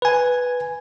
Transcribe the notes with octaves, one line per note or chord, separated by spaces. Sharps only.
B4 G#5